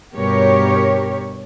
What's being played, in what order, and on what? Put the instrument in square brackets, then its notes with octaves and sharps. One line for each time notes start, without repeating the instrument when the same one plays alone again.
[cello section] G2 B2 G4 A#4 C#5